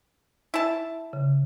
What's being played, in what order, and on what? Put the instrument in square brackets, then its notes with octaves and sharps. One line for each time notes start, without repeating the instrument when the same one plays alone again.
[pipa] E4 A5
[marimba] C#3